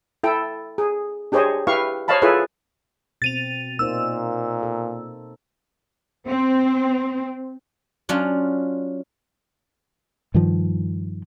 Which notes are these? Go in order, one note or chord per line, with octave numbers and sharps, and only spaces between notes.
E4 A4 G5
G#4
D4 G4 G#4 C5 C#5 D#5
E4 G4 B4 F5 C#6
C5 C#5 D#5 F5 A5 B5
E4 F4 G#4 A4 B4 C#5
B2 C4 A6 D#7 F7
A#2 A#3 D#4 C5 E6
A4
C4
F#3 C#4 D4 F4
G2 D#3 F3